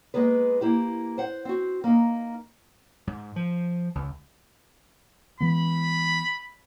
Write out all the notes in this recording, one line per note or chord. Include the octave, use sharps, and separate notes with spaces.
G#3 A#3 B3 B4
A#3 E4 G4
C5 F#5
C4 F#4
A#3 D#4
G#2
F3
C#2
E3 G#3 B3 B5